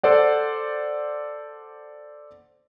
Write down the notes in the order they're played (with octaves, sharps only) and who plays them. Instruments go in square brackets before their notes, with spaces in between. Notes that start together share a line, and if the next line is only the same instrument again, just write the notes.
[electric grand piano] A4 C5 D5 F#5